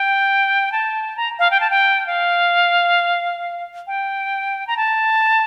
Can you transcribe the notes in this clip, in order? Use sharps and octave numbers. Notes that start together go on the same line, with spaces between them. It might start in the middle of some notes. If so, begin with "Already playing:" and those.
Already playing: G5
A5
A#5
F5
G5
A5
G5
F5
G5
A#5
A5